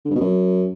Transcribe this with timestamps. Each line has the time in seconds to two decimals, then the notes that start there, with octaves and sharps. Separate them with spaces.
0.05 D3
0.10 G2
0.16 B2
0.21 F#2